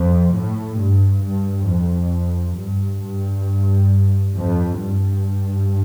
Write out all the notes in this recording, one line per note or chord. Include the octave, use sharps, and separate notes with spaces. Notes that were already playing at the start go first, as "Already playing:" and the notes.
Already playing: F2
A2
G2
G2
F2
G2
G2
F2
G2